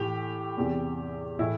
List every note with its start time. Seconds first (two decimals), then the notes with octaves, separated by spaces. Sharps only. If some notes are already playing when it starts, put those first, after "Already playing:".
Already playing: A2 E3 G4
0.57 E2 C3 E3
1.39 A2 E3 E4